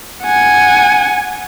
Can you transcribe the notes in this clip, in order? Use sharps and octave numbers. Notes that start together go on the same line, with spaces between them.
F#5 G#5